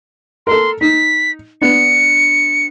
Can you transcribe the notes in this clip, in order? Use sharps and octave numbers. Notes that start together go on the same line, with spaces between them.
A4 A#4 C6
D#4 B6
B3 D4 C#7